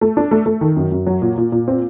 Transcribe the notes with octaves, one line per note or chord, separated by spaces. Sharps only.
A3
D4
A3
A3
D#3
F#2
F#2
F#3
A#2
A#2
A#2
C4